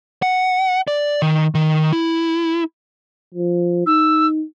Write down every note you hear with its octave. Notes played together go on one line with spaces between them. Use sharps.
F#5
D5
D#3
D#3
E4
F3
D#4 E6